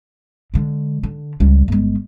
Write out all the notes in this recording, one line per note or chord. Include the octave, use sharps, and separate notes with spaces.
D3 G#3
D3
C#2 G3
G1 G#3